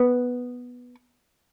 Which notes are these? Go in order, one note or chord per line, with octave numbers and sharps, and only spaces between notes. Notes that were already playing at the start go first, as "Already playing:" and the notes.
Already playing: B3